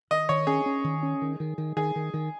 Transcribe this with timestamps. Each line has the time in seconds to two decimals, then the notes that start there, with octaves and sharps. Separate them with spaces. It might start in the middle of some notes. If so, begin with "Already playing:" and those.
0.11 D#3 D#5
0.29 D#3 C#5
0.47 C#4 G#4
0.66 C#4
0.84 D#3
1.03 C#4
1.22 D#3
1.40 D#3
1.58 D#3
1.77 D#3 G#4
1.96 D#3
2.14 D#3